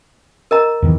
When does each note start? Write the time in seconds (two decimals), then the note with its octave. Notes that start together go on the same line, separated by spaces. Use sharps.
0.51 A#4 D#5 A#5
0.82 E2 D#3 E3